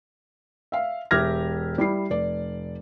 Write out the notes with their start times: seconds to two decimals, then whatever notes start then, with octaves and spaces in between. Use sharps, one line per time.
0.72 E5 F5
1.11 E1 G4 E5 F6 G#6 A#6
1.78 G3 E4 C7
2.10 F1 D5